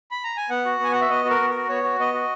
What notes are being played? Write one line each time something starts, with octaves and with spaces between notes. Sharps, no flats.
B5
A#5
G#5
B3 F#5
F#4
B3 G#5
F#4 F#5
E5
B3 D#5
F#4
A#4
B3
F#4 A#4
B3 C#5
F#4
B3 D#5
F#4